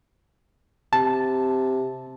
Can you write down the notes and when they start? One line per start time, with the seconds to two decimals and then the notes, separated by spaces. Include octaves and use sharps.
0.93 C3 A5